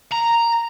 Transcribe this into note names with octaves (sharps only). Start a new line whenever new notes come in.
A#5